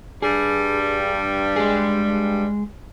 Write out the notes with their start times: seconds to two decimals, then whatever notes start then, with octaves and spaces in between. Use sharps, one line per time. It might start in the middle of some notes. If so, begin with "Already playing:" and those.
0.22 G2 G3 G#4
1.56 G#3 G#4